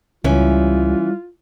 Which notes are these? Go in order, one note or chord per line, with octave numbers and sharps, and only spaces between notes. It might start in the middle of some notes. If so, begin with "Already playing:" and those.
C#2 E3 G3 C#4 F4